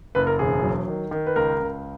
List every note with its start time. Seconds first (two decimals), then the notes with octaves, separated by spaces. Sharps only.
0.15 F#1 B4
0.27 A#4
0.39 E1 G#4
0.63 F#3
0.88 D#3
1.11 D#3
1.27 B4
1.36 C#2 A#4
1.60 C#2